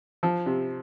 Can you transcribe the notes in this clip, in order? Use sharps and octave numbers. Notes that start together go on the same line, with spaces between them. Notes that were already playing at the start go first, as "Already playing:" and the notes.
F3
C3